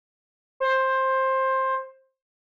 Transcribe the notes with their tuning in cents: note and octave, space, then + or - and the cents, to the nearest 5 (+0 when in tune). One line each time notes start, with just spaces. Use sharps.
C5 +15